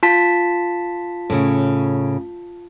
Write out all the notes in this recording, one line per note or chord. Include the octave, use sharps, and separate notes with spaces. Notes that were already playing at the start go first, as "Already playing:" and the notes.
F4 A5 B6
A2 C#3